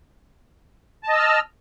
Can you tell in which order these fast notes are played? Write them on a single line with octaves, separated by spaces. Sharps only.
A5 D#5 E6 F6